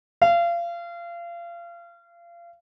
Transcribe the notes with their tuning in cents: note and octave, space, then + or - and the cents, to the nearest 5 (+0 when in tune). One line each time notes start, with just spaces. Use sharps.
F5 -30